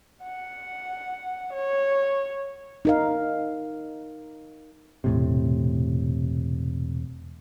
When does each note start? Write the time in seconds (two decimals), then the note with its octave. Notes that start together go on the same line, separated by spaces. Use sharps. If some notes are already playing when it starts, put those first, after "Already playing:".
0.23 F#5
1.53 C#5
2.85 D#4 A#4 F5
5.04 E1 A2 C3